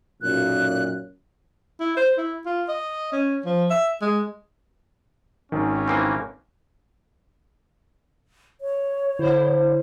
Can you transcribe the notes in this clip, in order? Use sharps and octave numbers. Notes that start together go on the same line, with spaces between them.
B1 F#2 A#2 F#6
E4
C5
E4
F4
D#5
C#4
F3
E5
G#3
G#1 D#3 C#4
E3 A#3 C4
C#5
D3 E4 C5